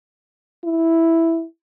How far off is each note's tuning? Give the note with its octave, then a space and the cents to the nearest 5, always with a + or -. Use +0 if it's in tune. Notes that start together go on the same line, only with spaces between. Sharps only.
E4 +0